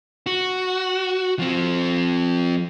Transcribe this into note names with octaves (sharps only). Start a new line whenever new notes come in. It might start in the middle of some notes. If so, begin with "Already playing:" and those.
F#4
F3 C4